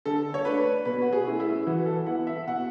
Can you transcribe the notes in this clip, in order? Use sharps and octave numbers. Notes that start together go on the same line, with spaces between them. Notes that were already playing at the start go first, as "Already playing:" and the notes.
D3 A4
C#5
A3 D4 B4
B2 B4
F#4
G#4
A3 C#4 E4
E4
E3 F#4
A4
B3 E4 F#5
E5
B2 F#5